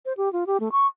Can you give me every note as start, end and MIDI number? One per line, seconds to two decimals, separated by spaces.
0.05 0.13 72
0.17 0.31 67
0.33 0.44 65
0.47 0.57 67
0.60 0.69 57
0.72 0.87 85